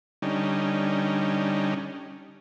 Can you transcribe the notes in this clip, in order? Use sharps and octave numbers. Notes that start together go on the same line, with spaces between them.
D3 G3 C#4 D#4